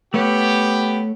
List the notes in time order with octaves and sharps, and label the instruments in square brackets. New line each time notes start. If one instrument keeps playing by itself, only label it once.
[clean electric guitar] A3 C#5 [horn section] B3 G4